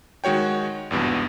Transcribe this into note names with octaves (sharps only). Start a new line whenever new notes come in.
D#3 G#3 F#4 C#5 G5
G#1 E2 G2 B2